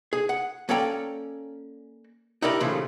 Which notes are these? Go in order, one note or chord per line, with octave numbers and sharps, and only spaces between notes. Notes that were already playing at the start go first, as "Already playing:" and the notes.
G#4
F#5
A#3 C#4 A4 D5 G5 A#5
D#4 E4 G4 A#4 D5
A#2 C#3 E3 F3 G3 A3